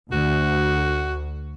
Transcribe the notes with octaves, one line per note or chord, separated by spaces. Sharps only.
D2 F#4